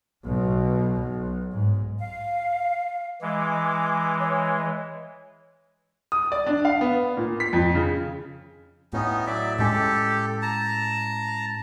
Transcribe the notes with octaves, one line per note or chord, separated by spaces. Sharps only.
B1 B2
B1
G#2
F5
E3 G#3 D6
C#5
D#6
D5
D4
F5
B3
A#2
B6
F2
C#3
A2 B3 C#4 D#4
F#3 D5 E5
A2 G#3 C#4 G4 A4
A5 A#5